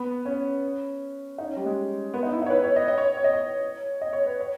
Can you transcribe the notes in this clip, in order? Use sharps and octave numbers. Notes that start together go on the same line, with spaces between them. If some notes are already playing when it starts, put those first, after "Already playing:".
Already playing: B3
C#4
D#4
C#4
G3
G#3
B3
D#4
E4
D#4
C#5
B4
C#5
D#5
D#5
C#5
C#5
D#5
C#5
D#5
C#5
B4
C#5